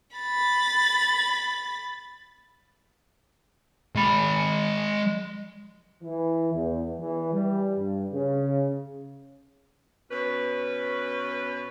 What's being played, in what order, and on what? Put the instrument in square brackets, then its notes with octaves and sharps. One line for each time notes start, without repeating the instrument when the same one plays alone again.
[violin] B5 A6
[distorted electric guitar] G#3 B5
[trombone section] E3
E2
E3
G3
G2
C#3
[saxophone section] B2 C#4 B4